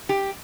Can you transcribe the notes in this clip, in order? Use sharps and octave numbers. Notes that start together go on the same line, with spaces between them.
G4